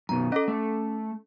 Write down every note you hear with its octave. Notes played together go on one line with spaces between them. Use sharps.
F#2 B2 D#3 A#5
C#4 A4 D#5
A3